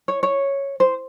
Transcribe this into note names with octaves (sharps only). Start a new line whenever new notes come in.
C#5
C#5
C5